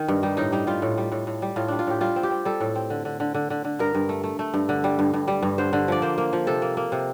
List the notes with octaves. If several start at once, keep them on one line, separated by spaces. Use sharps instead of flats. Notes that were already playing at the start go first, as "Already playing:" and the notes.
Already playing: D#3
G2
G3 D#4
A2 D#4
G3 D#4
G3 F4
A2
G3
A2
A2
G3
A2 F4
G3 D4
F4
A2 G4
G3 F4
C4
G4
C4
G3 A4
A2
C4
D3
D3
D3
D3
D3
D3
G2 A#4
G2
A3
A3
A3
G2
D3
G3
G2
G2
G3
G2
D3 C5
D3
F3 D5
A#3 C5
A#3
F3
C3 A4
A#3
A#3
C3